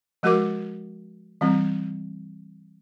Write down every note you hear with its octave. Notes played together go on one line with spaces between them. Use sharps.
F3 G#3 F#4 A#4 D6
E3 G3 C4